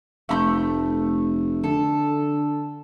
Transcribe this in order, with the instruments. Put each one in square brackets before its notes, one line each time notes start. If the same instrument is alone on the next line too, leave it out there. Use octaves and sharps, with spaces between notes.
[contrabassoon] F1 [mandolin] A3 B5 G6
[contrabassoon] D3 [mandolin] A4